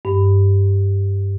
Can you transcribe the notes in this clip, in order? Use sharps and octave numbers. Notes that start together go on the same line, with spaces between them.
G2